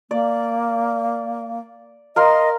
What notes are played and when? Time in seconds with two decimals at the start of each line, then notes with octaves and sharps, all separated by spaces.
0.11 A#3 D5
2.16 A#4 D#5 F5 C6